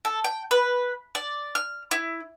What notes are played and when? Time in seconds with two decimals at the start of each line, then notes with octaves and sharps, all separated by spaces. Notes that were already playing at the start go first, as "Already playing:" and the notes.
0.05 A4
0.24 G5
0.51 B4
1.15 D5
1.55 F6
1.91 E4